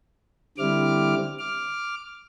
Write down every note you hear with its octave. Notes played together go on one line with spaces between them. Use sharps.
D3 G3 C4 E4 D6 F6
D6 F6